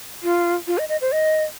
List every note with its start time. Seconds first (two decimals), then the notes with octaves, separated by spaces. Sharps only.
0.23 F4
0.67 F4
0.78 D#5
0.89 D#5
1.01 C5
1.12 D#5